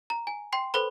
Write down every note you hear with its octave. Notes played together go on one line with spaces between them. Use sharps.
A#5
G#5
G5 C6 C7
A4 B4 C5 B5